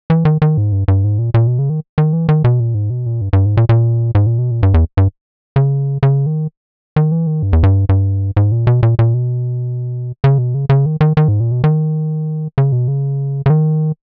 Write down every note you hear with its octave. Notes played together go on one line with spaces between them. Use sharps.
E3
D#3
D#3
G#2
G2
G2
G#2
A#2
A#2
B2
C#3
D#3
D#3
E3
D#3
B2
A#2
G#2
B2
A#2
G2
G2
G#2
A#2
A#2
G#2
A#2
B2
A#2
G2
E2
G2
C#3
C#3
D#3
D#3
E3
D#3
G2
E2
G2
G2
G#2
A#2
B2
A#2
A#2
B2
C#3
B2
C#3
C#3
D#3
D#3
D#3
G#2
A#2
B2
D#3
C#3
B2
C#3
C#3
D#3